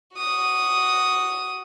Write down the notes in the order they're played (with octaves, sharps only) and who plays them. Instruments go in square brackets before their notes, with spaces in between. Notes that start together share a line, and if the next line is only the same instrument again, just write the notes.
[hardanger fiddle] F#4 D#6